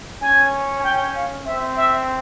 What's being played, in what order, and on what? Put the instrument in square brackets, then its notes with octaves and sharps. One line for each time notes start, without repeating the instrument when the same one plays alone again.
[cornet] C#4 [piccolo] G#5
[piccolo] G#5
G5
F5
[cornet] C4 [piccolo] E5
[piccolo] E5